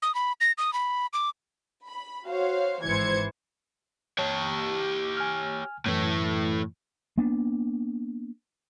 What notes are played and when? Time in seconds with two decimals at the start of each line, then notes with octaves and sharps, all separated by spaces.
0.02 D#6
0.15 B5
0.41 A#6
0.58 D#6
0.73 B5
1.13 D6
1.85 B5
2.25 F#4 C5 C#5 F5
2.84 G#1 G#2 E3 C5 G#6 C#7
4.19 G4 C#5 A5
5.17 G#5 F6
5.86 F#2 A2 E3 A3
7.18 A#3 B3 D4